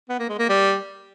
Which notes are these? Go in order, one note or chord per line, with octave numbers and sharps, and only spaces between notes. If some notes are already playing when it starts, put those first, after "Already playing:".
B3
A#3
G#3
A#3
G3